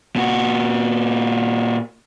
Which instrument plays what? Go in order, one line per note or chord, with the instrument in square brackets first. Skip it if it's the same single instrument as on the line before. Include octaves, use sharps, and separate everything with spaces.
[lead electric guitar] A#2 F#4